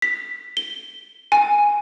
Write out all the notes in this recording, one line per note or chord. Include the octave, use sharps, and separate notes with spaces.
B6
G7
G#5